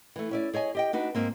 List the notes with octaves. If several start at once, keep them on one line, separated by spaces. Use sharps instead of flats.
E3 A3
C#4 E4 D5
G#4 C#5 D#5 G#5
G4 D#5 G5
D4 D#4 F#4 B4
G#2 A#3 C4